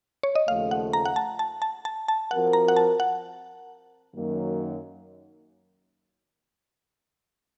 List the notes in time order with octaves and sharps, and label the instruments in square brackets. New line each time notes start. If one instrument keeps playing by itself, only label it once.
[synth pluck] C#5
D#5
[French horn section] D#2 C#3 F3 A3 [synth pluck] F5
[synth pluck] F#5
A#5
F#5
A5
A5
A5
A5
A5
[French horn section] F3 C4 F#4 A#4 [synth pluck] F#5
[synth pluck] A#5
F#5
A5
F#5
[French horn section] F#2 D#3 F#3 A#3